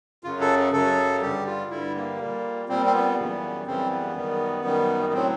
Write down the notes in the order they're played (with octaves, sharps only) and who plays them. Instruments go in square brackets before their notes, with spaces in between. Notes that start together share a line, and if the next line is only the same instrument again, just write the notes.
[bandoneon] F#2 C#3 F#3 F4
A4
F#2 C#3 F#3 A4
G2 D3 G3 G4
F4
G2 D3 G3 E4
A#3
A#2 G3
A#2 G3 C4
C4
B3
F#2 C#3 E3 G3
F#2 C#3 E3 G3 C4
B3
F#2 D#3 G3
F#2 D#3 G3
A2 F#3 C4